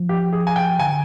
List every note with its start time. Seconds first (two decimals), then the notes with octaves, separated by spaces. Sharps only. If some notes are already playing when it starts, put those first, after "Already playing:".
Already playing: F3
0.09 G4
0.33 G#4
0.47 G#5
0.56 G5
0.79 D3 G#5